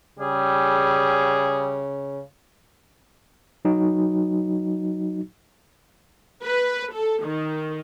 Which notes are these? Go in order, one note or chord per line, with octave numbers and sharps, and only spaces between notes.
C#3 G3 G#4
F#3 D#4 F#4
B4
A4
D#3